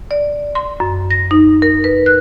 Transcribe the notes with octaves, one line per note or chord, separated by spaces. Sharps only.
D5
C6
F#2
A#6
D#4
A#4
B4
F#6